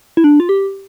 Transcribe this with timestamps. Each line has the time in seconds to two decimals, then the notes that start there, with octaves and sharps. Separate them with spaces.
0.17 E4
0.24 D4
0.40 F4
0.49 G4